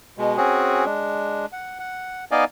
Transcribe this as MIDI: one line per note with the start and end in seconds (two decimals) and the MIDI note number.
0.18 0.37 47
0.18 0.37 56
0.37 0.85 60
0.37 0.85 61
0.37 0.85 66
0.37 0.85 68
0.86 1.46 56
0.86 1.46 62
1.52 1.79 78
1.79 2.25 78
2.31 2.44 59
2.31 2.44 63
2.31 2.44 74
2.31 2.44 75
2.31 2.44 77
2.31 2.44 80